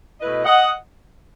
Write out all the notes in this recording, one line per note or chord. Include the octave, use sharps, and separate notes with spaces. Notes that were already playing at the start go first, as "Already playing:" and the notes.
B2 A3 E4 B4 D#5
D#5 F#5